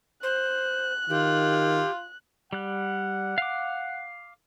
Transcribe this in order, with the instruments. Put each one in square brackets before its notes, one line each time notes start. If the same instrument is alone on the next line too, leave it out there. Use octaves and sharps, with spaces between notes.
[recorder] C5 [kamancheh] F#6
[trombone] D#3 [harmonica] F4 [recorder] G4
[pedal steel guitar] G3 F#6 [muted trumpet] F#5
[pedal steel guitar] F5 D6